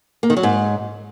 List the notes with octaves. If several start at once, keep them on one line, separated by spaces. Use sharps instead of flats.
A#3
D#3
F#3
G#2